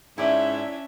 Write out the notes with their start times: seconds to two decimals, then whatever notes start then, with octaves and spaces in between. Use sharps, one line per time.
0.18 G#2 C#4 D4 E4 D5 E5